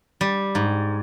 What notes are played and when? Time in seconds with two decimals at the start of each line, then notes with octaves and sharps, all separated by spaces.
0.21 G3
0.55 G#2